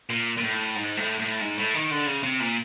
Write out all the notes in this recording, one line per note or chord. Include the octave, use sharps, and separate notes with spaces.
A#2
A#2
A2
G#2
A2
A2
G#2
A2
D#3
D3
C#3
C3
A#2